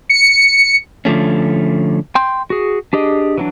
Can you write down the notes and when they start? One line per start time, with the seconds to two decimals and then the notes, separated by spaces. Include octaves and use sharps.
0.10 C#7
1.05 D3 F3 A3 C#4
2.15 G5 C6 G6
2.50 F#4 G#4
2.93 D4 G4 G#4 D#5
3.38 E3 F#3 D4